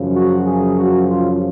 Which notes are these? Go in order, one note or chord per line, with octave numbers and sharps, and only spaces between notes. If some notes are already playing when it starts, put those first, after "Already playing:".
Already playing: F#2 C#3 F3
F#4
G#4
F#4
F4